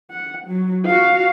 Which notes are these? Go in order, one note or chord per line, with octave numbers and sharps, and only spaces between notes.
F#5
F#3
F#4 F5